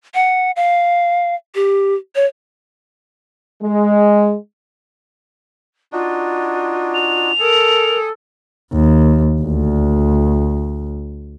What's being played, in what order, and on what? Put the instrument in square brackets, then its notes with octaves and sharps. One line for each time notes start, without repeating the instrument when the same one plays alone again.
[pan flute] F#5
F5
G4
C#5
[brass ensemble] G#3
[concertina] D4 D#4 F#4 [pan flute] F4
[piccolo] F7
[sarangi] A4 [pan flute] A#4 [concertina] G#5 D#6
[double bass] D#2
D2